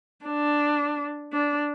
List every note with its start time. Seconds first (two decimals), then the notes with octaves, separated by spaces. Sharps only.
0.26 D4
1.32 D4